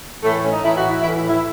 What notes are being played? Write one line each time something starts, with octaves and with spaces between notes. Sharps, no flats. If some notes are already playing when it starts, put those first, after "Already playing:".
A2 E3 A3
C#4
D#4
A2 E3 E4
F#4
E4
E3 E4
A2
E4